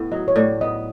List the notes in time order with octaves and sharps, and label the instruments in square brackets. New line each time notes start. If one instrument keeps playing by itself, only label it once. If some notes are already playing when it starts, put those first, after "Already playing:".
Already playing: [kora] A2 B3
[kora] F#3 [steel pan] D#5
[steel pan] C#5
[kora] A2 [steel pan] D5
[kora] B3 [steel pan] D#5